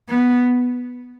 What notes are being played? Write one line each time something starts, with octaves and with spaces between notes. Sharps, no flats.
B3